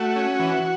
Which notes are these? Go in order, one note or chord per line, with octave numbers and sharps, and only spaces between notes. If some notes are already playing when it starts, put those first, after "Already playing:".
Already playing: A3 F#4
C#4
E3